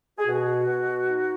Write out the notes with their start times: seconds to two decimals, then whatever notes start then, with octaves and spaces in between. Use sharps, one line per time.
0.18 G#4
0.26 B2 F#4
0.66 B2
1.05 D#4